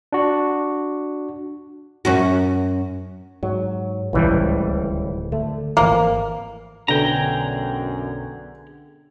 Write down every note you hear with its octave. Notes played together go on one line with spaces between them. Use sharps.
D4 F#4
F#2 C#4 F#4
G#2 F#3
D1 G#1 C#2 A2 E3 G3
D3 A3
G#1 E3 F3 A#3
B1 F#2 D3 B3 G#4 G5 A#5